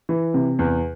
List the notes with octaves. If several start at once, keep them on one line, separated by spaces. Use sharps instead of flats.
E3
C3
E2